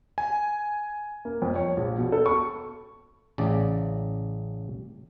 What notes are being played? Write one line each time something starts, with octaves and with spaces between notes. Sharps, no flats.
G#5
A#3
F2
C#5
A#1
B2
A4
C#6
A1 C#3 D5